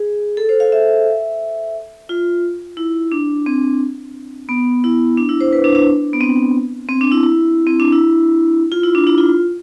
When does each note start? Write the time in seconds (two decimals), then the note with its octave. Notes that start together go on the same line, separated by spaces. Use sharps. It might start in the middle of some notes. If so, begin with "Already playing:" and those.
Already playing: G#4
0.37 A4
0.49 C5
0.60 F5
0.72 E5
2.09 F4
2.77 E4
3.12 D4
3.46 C4
4.49 B3
4.84 E4
5.17 D4
5.29 E4
5.41 C5
5.53 B4
5.64 D4
5.75 D4
6.13 B3
6.20 C4
6.89 C4
7.01 D4
7.12 E4
7.23 E4
7.67 C4
7.80 D4
7.92 E4
8.72 F4
8.84 E4
8.95 D4
9.07 E4
9.18 F4